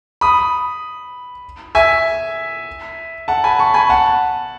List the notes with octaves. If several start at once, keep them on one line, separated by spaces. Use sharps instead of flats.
B5 D#6
E5 G#5
F#5 A5
G#5 B5
A5 C#6
G#5 B5
F#5 A5